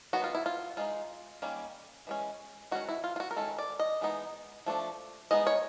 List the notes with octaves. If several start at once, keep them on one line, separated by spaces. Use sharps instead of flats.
D#3 F#3 B3 F#4
F4
E4
F4
G#3 B3 D#4 F4
D#3 G3 A#3 C#4
E3 G#3 C#4
D#3 G#3 C#4 F#4
E4
F4
F4
F#4
A#4
D#3 G#3 C#4 A4
D5
D#5
E3 G#3 B3 D#4
F3 A3 D4
G#3 B3 D#4 D#5
C#5